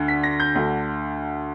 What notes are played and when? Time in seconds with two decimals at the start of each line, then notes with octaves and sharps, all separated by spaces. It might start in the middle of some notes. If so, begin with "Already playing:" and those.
Already playing: D2 D3
0.08 B6
0.23 A#6
0.40 G6
0.55 D2 D3